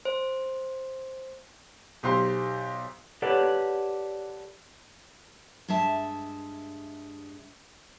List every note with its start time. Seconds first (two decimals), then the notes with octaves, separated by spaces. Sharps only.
0.05 C5
2.03 B1 G4 C5 C6
3.22 G4 A4 B4 C#5 D5 F#5
5.68 G2 G#3 E5 A5